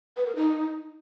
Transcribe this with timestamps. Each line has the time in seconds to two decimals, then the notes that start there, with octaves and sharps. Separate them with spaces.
0.17 B4
0.26 A#4
0.36 D#4